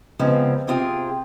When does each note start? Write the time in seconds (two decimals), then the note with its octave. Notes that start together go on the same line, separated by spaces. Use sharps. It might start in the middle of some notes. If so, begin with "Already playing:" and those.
0.19 F#2 C#3 F3 G#3 B3 C4
0.67 C3 C4 F4 G#4 G5